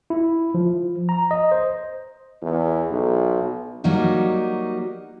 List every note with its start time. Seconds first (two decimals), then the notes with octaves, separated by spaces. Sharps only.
0.10 E4
0.54 F3
1.09 A#5
1.31 D#5
1.52 C5
2.42 E2
2.91 B1
3.84 F#3 G3 A#3 D#4 F#4